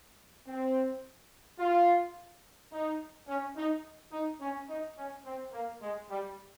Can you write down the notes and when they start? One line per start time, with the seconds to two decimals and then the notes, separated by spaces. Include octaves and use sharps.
0.47 C4
1.59 F4
2.72 D#4
3.28 C#4
3.57 D#4
4.12 D#4
4.41 C#4
4.69 D#4
4.98 C#4
5.26 C4
5.53 A#3
5.82 G#3
6.10 G3